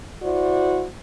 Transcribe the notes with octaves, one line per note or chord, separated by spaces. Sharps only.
E4 F#4 C5 D5